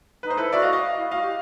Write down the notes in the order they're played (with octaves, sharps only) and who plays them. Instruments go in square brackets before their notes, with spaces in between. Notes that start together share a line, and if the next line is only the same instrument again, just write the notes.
[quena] D#4 [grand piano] B4
[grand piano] C5
[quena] E4 [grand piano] A4 B4
[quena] F#4 [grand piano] D5 E5
[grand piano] D#5 F5
D#5 F5
[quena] E4
[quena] F#4 [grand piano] D#5 F5
[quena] G4